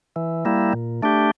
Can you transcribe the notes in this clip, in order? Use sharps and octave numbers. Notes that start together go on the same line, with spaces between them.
E3
G3 A#3 E4
A#2
A3 D4 G4